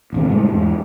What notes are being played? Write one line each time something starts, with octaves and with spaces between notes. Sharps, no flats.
A1 D#2 C3
F#1 A2 G3 G#3
E2 G#2